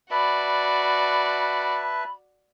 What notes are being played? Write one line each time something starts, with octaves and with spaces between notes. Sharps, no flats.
F#4 B4 D5 E5 A5 B5